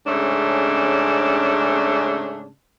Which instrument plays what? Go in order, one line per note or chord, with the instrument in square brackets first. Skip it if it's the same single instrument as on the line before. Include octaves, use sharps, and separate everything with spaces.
[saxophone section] G#2 C#3 A3 C#4 D4